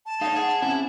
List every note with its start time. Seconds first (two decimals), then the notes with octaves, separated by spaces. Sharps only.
0.06 A5
0.21 D#4 C#5 D#5 F5
0.36 G#4 F#5
0.62 C4 C#4 E4 G#5